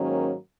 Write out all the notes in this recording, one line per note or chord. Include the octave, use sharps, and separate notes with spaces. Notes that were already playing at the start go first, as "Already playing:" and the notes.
Already playing: G#2 D#3 F#3 A#3 C#4